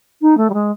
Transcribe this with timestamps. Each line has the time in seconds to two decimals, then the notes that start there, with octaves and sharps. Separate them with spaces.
0.22 D#4
0.37 A3
0.50 G3
0.54 G#3